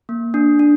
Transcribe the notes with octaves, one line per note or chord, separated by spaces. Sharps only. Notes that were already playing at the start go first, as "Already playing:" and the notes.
A#3
D4
D4